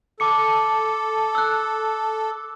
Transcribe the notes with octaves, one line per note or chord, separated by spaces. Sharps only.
A4 A5 D6 C#7
E6 F#6